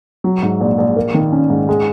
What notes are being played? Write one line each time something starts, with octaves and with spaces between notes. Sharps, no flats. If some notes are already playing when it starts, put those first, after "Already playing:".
F#3
G#2
A#1
A#1
A#3
D#3
C#4
G#2
G#3